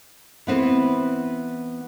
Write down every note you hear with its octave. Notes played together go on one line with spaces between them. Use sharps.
E3 B3 C4 E4 B4